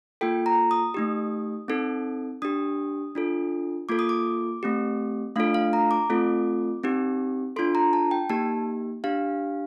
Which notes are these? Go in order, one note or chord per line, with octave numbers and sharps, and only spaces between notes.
A#3 F4 A4 G5
A#5
D#6
A3 D#4 G4
C4 D#4 A4
D4 G4 D#6
D4 F4 A4
A#3 F4 A4 D6
D#6
D6
A3 C4 G4
A3 D4 F4 A4 F5
F5
A#5
D6
A3 C4 F4 A4
C4 D#4 G4
D4 F4 A4 C6
A#5
A5
G5
A#3 D#4 G4 A5
D4 G4 F5